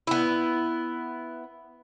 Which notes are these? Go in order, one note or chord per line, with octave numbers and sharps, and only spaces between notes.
B3 E4